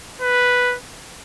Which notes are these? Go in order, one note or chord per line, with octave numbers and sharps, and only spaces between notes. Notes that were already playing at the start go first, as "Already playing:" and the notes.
B4